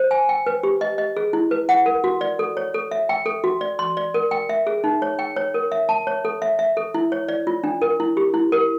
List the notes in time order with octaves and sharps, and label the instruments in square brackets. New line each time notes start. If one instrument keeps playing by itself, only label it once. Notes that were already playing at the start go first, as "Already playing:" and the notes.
Already playing: [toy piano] C5
G#5
G5
B4
G4
D#5
D#5
G#4
E4
B4
F#5
A#4
F#4
D5
A4
C#5
A4
E5
G5
A4
F#4
D5
C6
D5
A#4
G5
E5
G#4
D#4
C#5
G5
C#5
A#4
E5
A5
C#5
A4
E5
E5
A4
E4
C#5
D5
F4
D4
A#4
E4
G4
E4
A#4